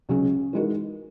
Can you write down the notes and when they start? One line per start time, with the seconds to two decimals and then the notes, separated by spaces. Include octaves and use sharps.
0.09 C#2 C#3 F#3 C#4 G#4
0.53 E3 G#3 D#4 F#4 A#4